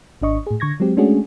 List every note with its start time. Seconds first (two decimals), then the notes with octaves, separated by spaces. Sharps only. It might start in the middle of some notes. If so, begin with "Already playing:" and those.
0.22 G#1 D4 D#5 C#6
0.47 A2 G#4
0.60 D3 C#6 G#6 A#6
0.80 F#3 G#3 C4 G4
0.97 G#3 A3 C#4 D4 F#4 G#4